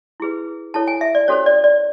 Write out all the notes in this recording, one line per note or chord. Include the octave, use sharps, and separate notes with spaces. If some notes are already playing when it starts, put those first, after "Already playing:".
E4 G#4 B4
E4 A4 C#5 A5
G#5
E5
D5
C#4 F#4 A4 C5 C#5
D5
D5